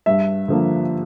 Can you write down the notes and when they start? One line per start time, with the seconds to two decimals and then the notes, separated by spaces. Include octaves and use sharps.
0.06 G2 E5
0.48 D3 F3 A#3